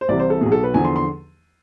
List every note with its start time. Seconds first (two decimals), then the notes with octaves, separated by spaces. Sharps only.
0.01 C5
0.08 C2 C3 E3 D5
0.20 C5
0.30 A4
0.41 B1 B2 G#4
0.52 A4
0.63 B4
0.74 E2 D3 F3 G#5
0.85 C6
0.96 C6